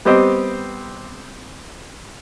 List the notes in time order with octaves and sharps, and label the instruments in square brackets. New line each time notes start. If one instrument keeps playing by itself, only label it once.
[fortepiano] G3 B3 C4 G4 C5 D#5